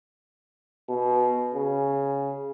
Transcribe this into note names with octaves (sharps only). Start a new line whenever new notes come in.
B2
C#3